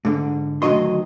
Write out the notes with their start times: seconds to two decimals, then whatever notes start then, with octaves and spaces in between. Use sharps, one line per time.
0.05 G#2 D3
0.62 D2 D#3 E3 F#3 D#5 C6